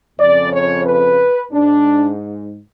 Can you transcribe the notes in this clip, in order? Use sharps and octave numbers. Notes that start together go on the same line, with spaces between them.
F2 C#3 D5
C#5
B4
G#2 D4